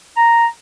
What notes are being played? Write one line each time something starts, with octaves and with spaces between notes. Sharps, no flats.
A#5